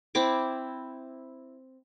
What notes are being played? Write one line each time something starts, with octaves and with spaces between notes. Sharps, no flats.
C4 E4 D6